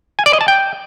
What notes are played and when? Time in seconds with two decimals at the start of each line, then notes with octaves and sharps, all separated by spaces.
0.19 G#5
0.26 D5
0.33 D#5
0.41 A5
0.48 G5